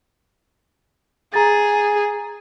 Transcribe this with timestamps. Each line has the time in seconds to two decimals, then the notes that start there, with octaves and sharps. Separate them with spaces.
1.34 G#4 A#5 A6